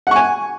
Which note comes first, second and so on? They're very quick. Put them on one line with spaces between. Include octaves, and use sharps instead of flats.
F#5 C#6 G#5